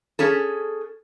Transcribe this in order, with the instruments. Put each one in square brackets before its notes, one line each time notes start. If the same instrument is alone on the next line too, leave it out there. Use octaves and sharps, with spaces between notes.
[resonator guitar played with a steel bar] C#4 G#4 A4